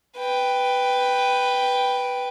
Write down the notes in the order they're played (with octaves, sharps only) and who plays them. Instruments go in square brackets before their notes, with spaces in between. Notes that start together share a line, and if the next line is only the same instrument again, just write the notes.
[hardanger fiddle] B4 G5